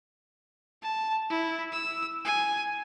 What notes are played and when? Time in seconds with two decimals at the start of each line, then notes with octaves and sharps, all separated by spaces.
0.82 A5
1.30 E4
1.72 E6
2.25 G#5